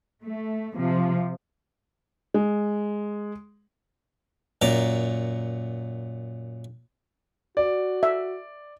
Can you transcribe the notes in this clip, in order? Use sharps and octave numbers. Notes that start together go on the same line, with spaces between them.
A3
C3 F3
G#3
F#2 A#2 A#5 D6
F#4 D5
E5